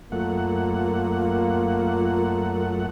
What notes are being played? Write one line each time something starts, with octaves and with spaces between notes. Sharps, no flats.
F#2 A3 A#3 F4 F#5